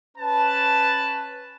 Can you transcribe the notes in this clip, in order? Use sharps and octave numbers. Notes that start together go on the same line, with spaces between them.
C#4 B4 A5